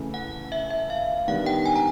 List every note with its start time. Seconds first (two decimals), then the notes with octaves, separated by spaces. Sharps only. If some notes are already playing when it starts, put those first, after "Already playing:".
Already playing: C#3 E3 A3
0.14 F#5
0.52 E5
0.70 E5
0.90 F5
1.27 D#3 G3 B3 D4 F#5
1.46 G5
1.66 G#5
1.76 A#5